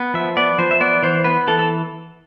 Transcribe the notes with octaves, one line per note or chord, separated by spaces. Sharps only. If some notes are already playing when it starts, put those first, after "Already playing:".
Already playing: B3
F3 E5
B3 D5
F3 C5
E5
B3 D5
E3 C5
B3 B4
E3 A4
A4